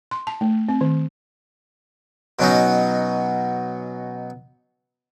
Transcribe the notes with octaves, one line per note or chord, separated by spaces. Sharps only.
C6
A5
A3
C4
D#3
B2 F#3 C#4 D#4